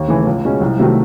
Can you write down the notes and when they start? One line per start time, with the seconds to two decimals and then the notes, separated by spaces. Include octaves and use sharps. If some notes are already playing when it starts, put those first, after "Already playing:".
Already playing: D#2
0.08 C#3 E3 A3
0.27 C#2
0.45 B2 G#3 C#4
0.61 C2
0.79 C3 D#3 F#3 A3